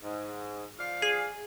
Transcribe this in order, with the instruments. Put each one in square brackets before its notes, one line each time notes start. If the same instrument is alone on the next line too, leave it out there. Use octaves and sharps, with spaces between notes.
[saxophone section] G#2
F3 D5 F5
[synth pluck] G#4